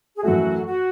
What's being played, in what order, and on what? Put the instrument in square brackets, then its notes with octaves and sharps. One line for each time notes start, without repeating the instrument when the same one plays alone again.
[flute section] G#4
[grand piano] F#2 E3 A3 [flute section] F#4
[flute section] F#4